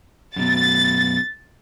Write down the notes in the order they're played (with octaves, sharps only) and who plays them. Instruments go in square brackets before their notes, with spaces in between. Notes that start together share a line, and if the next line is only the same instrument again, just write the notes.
[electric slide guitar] F#2 B2 [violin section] A6